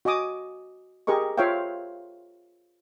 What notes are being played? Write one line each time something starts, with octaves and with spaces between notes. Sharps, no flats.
F#4 D#5 G#5 D6 D#6
G4 G#4 A#4 D#5 C#6
F4 C5 C#5 E5 F5 G5